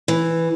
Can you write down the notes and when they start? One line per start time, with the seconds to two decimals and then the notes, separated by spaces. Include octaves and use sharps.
0.08 E3